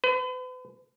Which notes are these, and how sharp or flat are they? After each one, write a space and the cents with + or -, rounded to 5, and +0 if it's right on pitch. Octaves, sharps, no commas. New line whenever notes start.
B4 +40